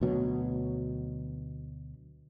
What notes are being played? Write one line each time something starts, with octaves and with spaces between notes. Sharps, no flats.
D2 B2 F#3